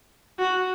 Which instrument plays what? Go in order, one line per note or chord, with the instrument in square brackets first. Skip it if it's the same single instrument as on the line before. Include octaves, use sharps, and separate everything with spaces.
[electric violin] F#4